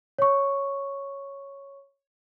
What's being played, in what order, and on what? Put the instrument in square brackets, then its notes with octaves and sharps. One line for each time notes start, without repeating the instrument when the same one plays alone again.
[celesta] C#5 C#6